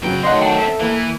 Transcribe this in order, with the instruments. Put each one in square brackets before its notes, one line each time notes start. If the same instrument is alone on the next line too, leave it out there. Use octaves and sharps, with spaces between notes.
[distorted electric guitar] F#2 G5 [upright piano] C#3 F#3 [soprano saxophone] B3
[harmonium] D#3 F#3 A3 [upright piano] D#5 F#5 [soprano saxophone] C6
[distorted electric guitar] C4 D4 [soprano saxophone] F#5 [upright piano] G5 A5
[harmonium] A4 [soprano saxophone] E5
[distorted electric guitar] E3 [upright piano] A#3 [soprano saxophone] E4